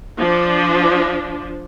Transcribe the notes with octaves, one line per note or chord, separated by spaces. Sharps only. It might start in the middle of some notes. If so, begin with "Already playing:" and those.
F3 D4